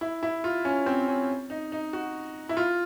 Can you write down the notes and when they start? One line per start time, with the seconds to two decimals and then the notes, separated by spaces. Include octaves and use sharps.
0.01 E4
0.23 E4
0.44 F4
0.65 C#4
0.86 C4
1.08 C#4
1.50 D#4
1.72 D#4
1.93 F#4
2.49 E4
2.57 F4